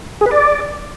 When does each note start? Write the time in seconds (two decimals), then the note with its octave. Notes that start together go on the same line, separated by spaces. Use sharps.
0.21 G#4
0.26 B4
0.31 D5